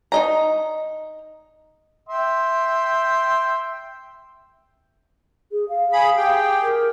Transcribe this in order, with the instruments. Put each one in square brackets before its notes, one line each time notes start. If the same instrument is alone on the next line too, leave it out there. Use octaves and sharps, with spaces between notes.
[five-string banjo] D#4 D#5 A#5
[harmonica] E5 G5 C6
[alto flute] G#4
F5
[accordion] G#4 B5
G4 G#4 G5
[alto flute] A#4